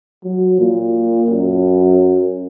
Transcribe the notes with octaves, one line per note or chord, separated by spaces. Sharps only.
F#3
A#2
F#2